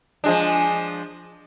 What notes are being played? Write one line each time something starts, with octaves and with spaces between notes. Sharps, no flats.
F3 G#3 D4